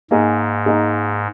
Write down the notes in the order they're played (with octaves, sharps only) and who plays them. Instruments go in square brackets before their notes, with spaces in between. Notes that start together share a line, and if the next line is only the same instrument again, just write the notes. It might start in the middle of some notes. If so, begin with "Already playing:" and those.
[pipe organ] G#2 [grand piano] A#3 D#4 G#4
[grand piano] A#3 D#4 G#4